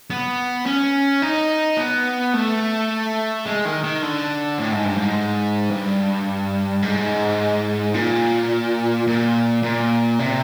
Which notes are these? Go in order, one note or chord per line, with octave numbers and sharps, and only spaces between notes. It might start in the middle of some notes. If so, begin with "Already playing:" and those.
B3
C#4
D#4
B3
A3
G#3
D#3
D#3
D3
A2
G#2
G2
G#2
G2
G#2
A#2
A#2
A#2
C3